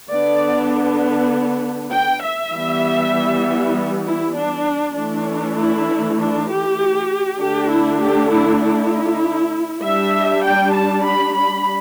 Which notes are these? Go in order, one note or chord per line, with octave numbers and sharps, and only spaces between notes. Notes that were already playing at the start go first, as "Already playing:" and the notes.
D3 B3 D4 D5
G5
E5
E3 G3 B3
E4
D4
E3 A3 D4
E4
D4
G4
D3 A3 D4 G4
E4
G4
E4
E4
G3 D4 E5
G5
A5
B5
B5